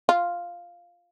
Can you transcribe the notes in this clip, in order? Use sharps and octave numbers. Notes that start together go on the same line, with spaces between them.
F4